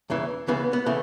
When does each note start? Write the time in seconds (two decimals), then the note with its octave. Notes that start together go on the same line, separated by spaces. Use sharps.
0.10 E2 C#3 E3
0.48 C#2 C#3 E3 B3
0.73 B3
0.86 C#3 E3 A3